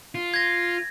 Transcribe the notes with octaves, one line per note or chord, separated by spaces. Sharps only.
F4
G#6 A#6